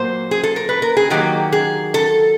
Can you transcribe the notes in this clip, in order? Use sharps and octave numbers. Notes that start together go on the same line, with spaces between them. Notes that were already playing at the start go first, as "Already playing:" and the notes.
Already playing: A#2 F#3 A#3 C5
G#4
A4
A#4
B4
A#4
G#4
D#3 F#3 A#3 G4
G#4
A4